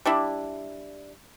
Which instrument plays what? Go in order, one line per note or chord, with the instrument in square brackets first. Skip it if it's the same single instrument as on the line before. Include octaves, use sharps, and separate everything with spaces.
[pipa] G3 D4 E4